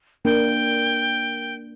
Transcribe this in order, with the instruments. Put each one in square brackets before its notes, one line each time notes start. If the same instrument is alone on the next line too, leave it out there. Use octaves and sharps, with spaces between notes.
[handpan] A#3 D4 A#4 [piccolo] G5